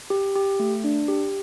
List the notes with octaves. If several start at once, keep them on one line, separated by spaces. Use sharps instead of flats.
G4
G4
A3
D4
G4